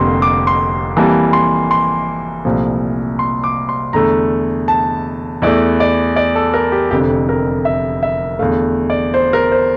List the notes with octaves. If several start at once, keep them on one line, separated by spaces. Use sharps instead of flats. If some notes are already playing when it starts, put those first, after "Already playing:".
Already playing: F1 F2 D3 G3 A#3 C6
D6
C6
F2 E3 G3 A#3 A5
C6
C6
C2 A#2 F3 A3
C6
D6
C6
E2 D3 A3 A#5
A5
E2 E3 A3 D5
D5
D5
A4
A#4
G4
F1 F2 D3 G4
A#4
E5
E5
E2 D3 A3 F5
D5
C5
A#4
C5